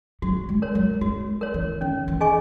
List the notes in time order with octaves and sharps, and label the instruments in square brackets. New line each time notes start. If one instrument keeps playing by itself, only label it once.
[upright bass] F#3 [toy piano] F#4
[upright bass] G#3
[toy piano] A#4 C#5
[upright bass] F#3
[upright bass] G#3 [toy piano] F#4
[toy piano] A#4 C#5
[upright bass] E3
[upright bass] D#3 [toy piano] C#4
[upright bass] E3
[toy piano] G#4 D#5 G#5 C#6